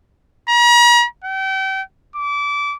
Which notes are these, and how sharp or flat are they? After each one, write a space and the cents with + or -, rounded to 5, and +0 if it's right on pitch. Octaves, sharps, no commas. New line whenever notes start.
A#5 +45
G5 -35
D6 -25